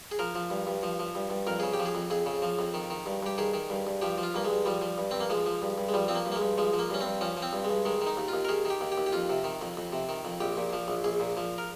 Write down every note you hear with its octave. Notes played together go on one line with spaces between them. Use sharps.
G#4
F3 A#4
F3
G2
G2
F3
F3
G2
G2
F2 A#4
C#3 G#4
G4
F3
G#4
F2
F2 G#4
C#3
F3
F2
D#3
D#3
G2
G2 G4
D#3 G#4
D#3
G2
G2
F3 G4
F3
F4
G2 A#3
G#3
G2
F3 G3
F3
G2
G2 C4
A#3
F3 G#3
F3
G2
G2
G#3
F3 G3
F3 C4
A#3
G2
A#3
G#3
G2
F3 G#3
F3
A#3
G2 C#4
G2 C4
F3 C#4
F3
C4
G2
G#3
G2
D#3 G#3
D#3
D#4
D#2
F4
D#2
A#4
D#3 G#4
D#3
G4
D#2
G4
D#2
G4
F2 F4
C3
D#3
F2
F2
C3
D#3
F2
A#1 G4
A#2
F3
A#1
A#1 G#4
A#2
F3
A#4